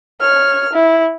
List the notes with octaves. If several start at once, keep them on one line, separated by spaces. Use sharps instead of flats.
C#5 F6
E4